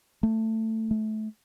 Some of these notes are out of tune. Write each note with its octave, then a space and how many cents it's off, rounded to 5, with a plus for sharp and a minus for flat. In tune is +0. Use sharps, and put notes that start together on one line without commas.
A3 +15
A3 -25